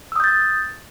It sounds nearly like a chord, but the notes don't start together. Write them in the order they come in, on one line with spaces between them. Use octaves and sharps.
E6 D#6 G6 A6